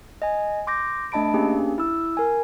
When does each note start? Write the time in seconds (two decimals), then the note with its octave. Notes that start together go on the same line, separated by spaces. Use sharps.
0.22 D#5 G#5
0.67 C6 D6 G6 A#6
1.12 A3 D4 D#5 A5 B5 D7
1.34 A#3 C#4 D4 G4 G#4
1.78 E4 E6
2.17 A#4 G#5